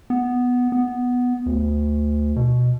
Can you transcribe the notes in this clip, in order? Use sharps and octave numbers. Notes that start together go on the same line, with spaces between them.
B3
B3
D2
B2